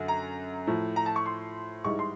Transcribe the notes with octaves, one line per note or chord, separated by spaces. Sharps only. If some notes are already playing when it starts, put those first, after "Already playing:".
Already playing: F#2 D3 F#3
A#5
A2 F3
A#5
A5
C#6
C6
G#2 E3 G3 C#6
C6